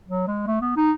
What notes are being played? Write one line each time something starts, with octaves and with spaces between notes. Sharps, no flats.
F#3
G#3
A3
B3
D#4